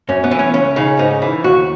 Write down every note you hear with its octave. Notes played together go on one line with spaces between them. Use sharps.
F#2 C#4
B3
E3
C#4
C#2 C#4
C#3 D#4
G#2 D#4
E3
D#2 F#4